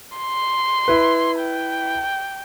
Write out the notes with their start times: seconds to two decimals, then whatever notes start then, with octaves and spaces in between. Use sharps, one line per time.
0.17 C6
0.88 E4 B4
1.41 G5